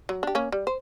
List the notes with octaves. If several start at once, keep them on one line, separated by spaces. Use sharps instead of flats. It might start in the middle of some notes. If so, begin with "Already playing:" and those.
F#3
D4 G4
A#3 C#4
G3
C5